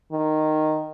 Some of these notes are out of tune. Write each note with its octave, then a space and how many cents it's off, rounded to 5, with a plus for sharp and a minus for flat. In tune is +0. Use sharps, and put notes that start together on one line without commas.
D#3 -10